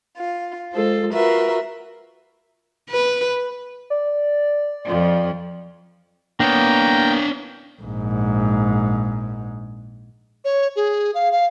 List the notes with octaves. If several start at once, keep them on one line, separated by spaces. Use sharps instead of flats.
F4
G#3 F4 A4 C5
F4 F#4 A#4 B4 E5
B4
D5
F2 F3
A#3 B3 D4 C#5 G5 A#5
A#1 G#2
C#5
G#4
F5
F5